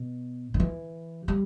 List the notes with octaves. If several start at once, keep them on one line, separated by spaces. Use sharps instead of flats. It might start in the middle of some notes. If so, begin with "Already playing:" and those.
Already playing: B2
D#3
E3
G3